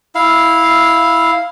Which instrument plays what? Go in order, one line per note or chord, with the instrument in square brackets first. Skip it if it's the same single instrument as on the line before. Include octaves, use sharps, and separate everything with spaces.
[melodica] E4 F5